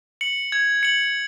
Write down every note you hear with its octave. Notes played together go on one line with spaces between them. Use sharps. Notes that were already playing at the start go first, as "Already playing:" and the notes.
C#7 F#7
G#6
C#7 F#7